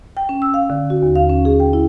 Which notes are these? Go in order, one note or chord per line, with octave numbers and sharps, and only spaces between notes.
G5
C#4
E6
F5
D3
F#4
D#2
F5
C#4
G#4
G5
E4